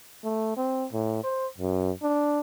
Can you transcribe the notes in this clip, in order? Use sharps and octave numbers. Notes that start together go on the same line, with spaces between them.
A3
C4
A2
C5
F#2
D4